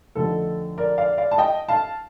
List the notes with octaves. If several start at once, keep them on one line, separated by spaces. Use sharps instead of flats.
F2 D3 A3 D#4 A4
A#4 D5
D5 F5
D5 F5
A5
D#5 G5
F5 A5